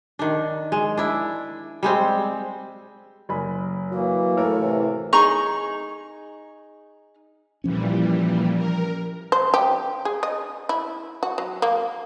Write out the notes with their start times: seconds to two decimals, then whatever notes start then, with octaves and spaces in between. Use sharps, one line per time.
0.19 D#3 D4
0.72 G#3
0.98 D4 E4
1.83 G3 G#3 C4
3.29 F#1 G#5 B5
3.91 E3 F#3 A#3
4.37 A2 A4 A#4 C#5
4.56 C3 E3
5.13 D#4 G#4 A#5 C#6
7.64 A#2 E3 F3 G3 C#4
8.56 A#4
9.32 C5
9.54 G4
10.05 G#4
10.23 D#5
10.69 E4
11.23 F#4
11.38 F#3
11.62 A#3